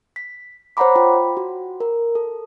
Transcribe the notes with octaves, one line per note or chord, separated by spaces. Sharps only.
B6
C5 C#5 F#5 A#5 B5 D6
F4 G5 B5
F#4
A#4
A4